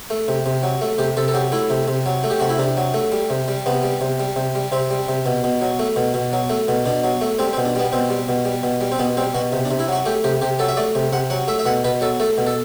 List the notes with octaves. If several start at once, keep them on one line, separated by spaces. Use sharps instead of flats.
A3
C3
C3
F#3
A3
C3 G4
C3 A4
A4
F#3 G4
A3 E4
C3
C3
F#3
A3
G4
C3 F#4
E4
C3 D4
F#3
A3
G3
C3
G3
C3 B3
G3
C3
G3
C3
G3
C3 C4
G3
C3
B2
B2
F#3
A3
B2
B2
F#3
A3
B2
B2 D4
F#3
A3
G3 C4
C4
B2
D4
G3 B3
B2 C4
G3
B2
G3
B2
G3
C4
B2 B3
G3 C4
B2 F#4
C3
D4
C3
E4
F#3 F#4
A3 G4
C3 G4
C3 G4
F#3 A4
E5
A3 D5
C3
C3 F#5
F#3 F#5
A3 E5
E5
B2 F#5
B2 B4
F#3 A4
A3 A4
B2
A4